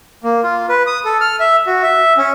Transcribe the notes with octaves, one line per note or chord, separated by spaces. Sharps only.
A#3
F4
B4
D#6
A4
F6
E5
F#4
E5
C#4